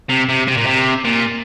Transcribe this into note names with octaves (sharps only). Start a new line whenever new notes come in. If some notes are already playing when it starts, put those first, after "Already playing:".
C3
C3
C3
A#2
C3
A#2